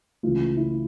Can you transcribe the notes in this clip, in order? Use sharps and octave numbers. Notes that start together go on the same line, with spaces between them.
C#2 C#3 E3 A3 F4
E4